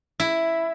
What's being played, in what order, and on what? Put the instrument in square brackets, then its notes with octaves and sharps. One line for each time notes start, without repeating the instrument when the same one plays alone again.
[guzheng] E4